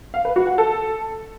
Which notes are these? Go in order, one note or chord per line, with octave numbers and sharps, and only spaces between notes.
F5
B4
F#4
F#5
A4